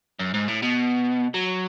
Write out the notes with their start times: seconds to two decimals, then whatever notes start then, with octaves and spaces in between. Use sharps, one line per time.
0.19 F#2
0.34 G#2
0.48 A2
0.62 B2
1.34 F#3